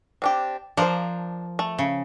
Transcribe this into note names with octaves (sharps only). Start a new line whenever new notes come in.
C4 D4 G4
F3 D4 A#4 C5 A#5
A3
C#3